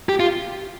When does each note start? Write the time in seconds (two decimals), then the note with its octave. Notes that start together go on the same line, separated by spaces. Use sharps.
0.09 G4
0.20 F4